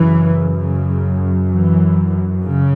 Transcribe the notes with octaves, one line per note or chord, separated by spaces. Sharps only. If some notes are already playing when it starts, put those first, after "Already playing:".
Already playing: F#2 C#3 E3
C#3
E3
C#3